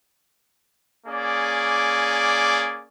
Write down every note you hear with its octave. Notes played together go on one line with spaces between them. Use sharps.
A#3 C#4 G#4 D5